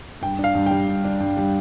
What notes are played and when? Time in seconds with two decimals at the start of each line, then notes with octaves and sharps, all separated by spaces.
0.21 G2 G5
0.39 D4
0.44 F5
0.55 G2
0.66 G3 G5
0.88 G2
1.04 D4
1.20 G2
1.37 G3